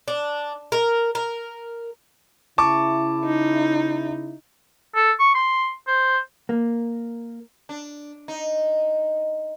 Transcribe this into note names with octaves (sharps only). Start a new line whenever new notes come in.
D4
A#4
A#4
C#3 E4 A5 C#6 D6
D#4
A4
C#6
C6
C5
A#3
D4
D#4